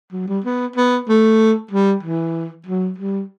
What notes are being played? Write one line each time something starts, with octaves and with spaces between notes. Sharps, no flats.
F#3
G3
B3
B3
A3
G3
E3
F#3
G3